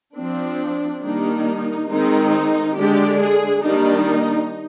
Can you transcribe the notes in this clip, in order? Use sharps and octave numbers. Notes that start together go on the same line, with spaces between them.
F3 C4 D4
D#3 G3 A#3 D4 D#4
D#3 G#3 C4 D#4
D3 G#3 D4 G4
G#4
D#3 G3 A#3 D4 D#4